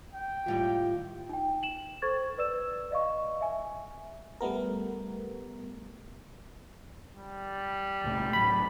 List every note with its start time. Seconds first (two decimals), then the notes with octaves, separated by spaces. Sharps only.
0.14 G5
0.46 D#2 A2 G3 F4
1.29 D#4 G5
1.63 E7 F#7
2.02 A4 C5 C#6 G#6 A6
2.38 B4 D5 E6 E7
2.91 D5 D#5 F5 C#6
3.41 E5 G#5
4.41 G3 A3 B3 A#4
7.16 G3
8.04 C#2 A#2 A3
8.33 C#2 A2 F#3 B5